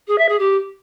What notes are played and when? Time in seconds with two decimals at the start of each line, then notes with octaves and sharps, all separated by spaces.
0.08 G#4
0.18 E5
0.29 G#4
0.39 G4